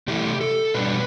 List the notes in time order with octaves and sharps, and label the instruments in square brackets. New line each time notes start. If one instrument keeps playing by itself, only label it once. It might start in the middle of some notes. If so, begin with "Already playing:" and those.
[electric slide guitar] C3 E3 A3 E4 G4
A4
B2 G3 D4 B4